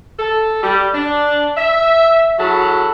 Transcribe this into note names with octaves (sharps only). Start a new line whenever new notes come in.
A4
G3
D4
E5
F#3 E4 F#4 G#4 A4